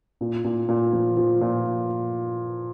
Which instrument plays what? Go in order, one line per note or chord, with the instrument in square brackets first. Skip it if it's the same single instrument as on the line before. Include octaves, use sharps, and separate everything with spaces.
[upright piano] A#2
A#2
A#2
F3
F3
A#2